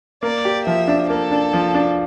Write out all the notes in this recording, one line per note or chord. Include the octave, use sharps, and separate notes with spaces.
A#3 D5
G4
F3 E5
D4
A#3 A4
D4
F3
D4